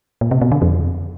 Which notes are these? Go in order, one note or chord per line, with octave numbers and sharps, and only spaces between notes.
A#2
C3
B2
D3
F2